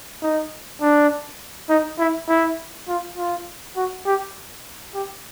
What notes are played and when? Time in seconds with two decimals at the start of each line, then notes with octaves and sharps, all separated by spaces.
0.22 D#4
0.81 D4
1.69 D#4
1.99 E4
2.28 E4
2.88 F4
3.17 F4
3.76 F#4
4.06 G4
4.94 G4